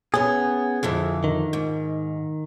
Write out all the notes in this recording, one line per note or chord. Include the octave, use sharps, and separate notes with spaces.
B3 C#4 G#4
F2 D3 E3
D#3
G#2